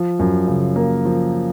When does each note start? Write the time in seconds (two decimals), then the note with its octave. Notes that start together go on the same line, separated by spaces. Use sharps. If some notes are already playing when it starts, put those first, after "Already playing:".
Already playing: F3
0.19 F#2
0.47 C#3
0.76 A#3
1.05 F3